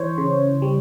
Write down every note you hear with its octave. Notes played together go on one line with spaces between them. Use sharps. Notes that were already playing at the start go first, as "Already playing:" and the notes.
Already playing: E3 C5 C#5
C#3
G3